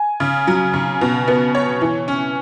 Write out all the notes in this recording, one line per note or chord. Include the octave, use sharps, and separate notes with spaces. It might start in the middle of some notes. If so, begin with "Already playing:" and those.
Already playing: G#5
C#3
F#3
C#3
B2
B3
C#5
E3
C#4